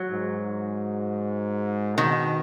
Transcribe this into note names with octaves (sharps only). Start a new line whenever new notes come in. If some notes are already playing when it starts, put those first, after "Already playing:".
Already playing: F#3
G#2
B2 D#3